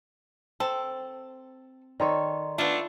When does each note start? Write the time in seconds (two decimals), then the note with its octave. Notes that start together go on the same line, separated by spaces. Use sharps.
0.60 C4 A4
2.00 D#3 A4 C#5 D5 A#5 C6
2.58 A3 B3 D4 F4